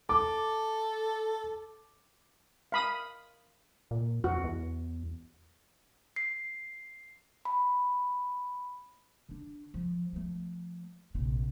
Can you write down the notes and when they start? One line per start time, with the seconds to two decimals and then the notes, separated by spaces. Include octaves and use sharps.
0.09 A4 D6
2.72 F5 B5 D#6
3.91 A#2
4.24 F2 F#4
4.44 E2
6.16 C7
7.45 B5
9.29 D3 D4
9.74 F3
10.13 F3 A3
11.14 A#1 C3